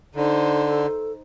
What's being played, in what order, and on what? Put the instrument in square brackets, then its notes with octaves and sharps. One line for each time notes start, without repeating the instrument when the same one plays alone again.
[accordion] D3 [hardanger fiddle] D#4 C5 [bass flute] A4